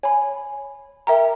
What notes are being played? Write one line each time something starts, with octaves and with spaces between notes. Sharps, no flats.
C#5 G#5 B5
A#4 E5 G5 A#5